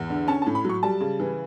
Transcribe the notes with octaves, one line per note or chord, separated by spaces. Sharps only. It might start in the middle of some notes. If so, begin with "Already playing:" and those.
Already playing: E2
D3
C#4 A5
A5
A2
B5
F#3 C#6
G3 A5
C#3
E3